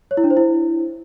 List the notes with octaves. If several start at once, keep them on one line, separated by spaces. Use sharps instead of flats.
C#5
E4
D4
C5
E4